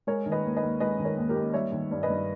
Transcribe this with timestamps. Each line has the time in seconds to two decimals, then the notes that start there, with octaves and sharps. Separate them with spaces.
0.07 G#3 A#4 C#5
0.26 D#3
0.32 B4 D#5
0.45 D#2
0.57 B4 D#5
0.63 D#2
0.80 G#3 B4 D#5
0.99 D#3
1.05 A#4 C#5
1.18 D#2
1.29 G4 A#4
1.36 D#2
1.54 G3 C#5 E5
1.72 D#3
1.91 G2
2.03 B4 D#5
2.10 G2